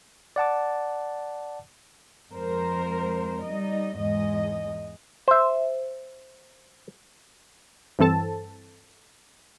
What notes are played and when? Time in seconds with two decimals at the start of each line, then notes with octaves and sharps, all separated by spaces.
0.36 D5 F#5 A5 D6
2.32 F2 G#3 A#4 C5
3.44 G3 D#4 D#5
3.97 E2 G#2 G#3 D#5
5.28 C5 E5
7.99 G2 E3 C4 A4 A5